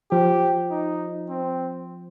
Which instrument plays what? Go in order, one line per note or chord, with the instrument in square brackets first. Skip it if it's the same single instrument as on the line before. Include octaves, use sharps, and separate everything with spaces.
[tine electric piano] F3 [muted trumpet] G4
[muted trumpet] D#4
C4